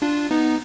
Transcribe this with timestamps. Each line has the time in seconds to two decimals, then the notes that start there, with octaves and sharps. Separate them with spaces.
0.02 D4 F4
0.31 B3 D#4